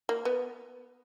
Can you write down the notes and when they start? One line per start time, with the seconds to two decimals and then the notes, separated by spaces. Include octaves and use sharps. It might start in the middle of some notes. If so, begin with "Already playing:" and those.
0.09 A#3
0.25 B3